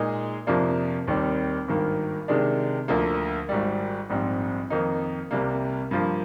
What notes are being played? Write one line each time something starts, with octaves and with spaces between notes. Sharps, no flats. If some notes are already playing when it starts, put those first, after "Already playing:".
Already playing: A#2 G#3 D#4 G#4
F2 C3 F3 A#3 D4
D#2 D#3 G3 C4
G#1 G2 D#3 A#3
C3 D#3 G#3 D4
D2 D3 F3 A#3
G#1 G#2 G3
A#1 G#2 G3 C4
F2 D#3 A#3 D#4
C2 C3 G3 A#3
G2 F3 A#3